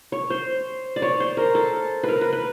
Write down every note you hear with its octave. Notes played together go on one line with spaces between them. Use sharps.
C#5
C5
D5
C#5
C5
A#4
A4
A#4 B4
B4
B4